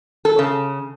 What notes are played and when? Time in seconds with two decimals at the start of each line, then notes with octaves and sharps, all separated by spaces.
0.25 A4
0.39 C#3